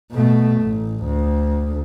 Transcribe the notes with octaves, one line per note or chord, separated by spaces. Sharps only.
B2 A3
A1
D2